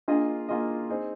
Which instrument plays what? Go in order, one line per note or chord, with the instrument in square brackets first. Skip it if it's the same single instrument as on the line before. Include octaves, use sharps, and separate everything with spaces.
[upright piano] A#3 F4 G#4 D#5 [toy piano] D4
[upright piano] A#3 F4 G#4 D#5
C4 D#4 G#4